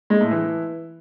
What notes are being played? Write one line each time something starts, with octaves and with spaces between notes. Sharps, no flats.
G#3
A2
E3